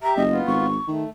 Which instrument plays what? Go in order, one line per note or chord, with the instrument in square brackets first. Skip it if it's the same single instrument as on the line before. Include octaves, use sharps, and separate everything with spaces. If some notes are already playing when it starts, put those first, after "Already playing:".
[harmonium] G4 E5 [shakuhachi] A#5
[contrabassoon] F#1 [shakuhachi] D#5
[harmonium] B3 F4
[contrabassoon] G#1 [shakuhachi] C#6
[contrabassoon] D#3 [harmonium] A3